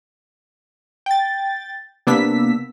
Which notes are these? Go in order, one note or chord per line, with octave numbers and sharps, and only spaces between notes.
G5 A6
C3 A#3 B3 D4 E6 B6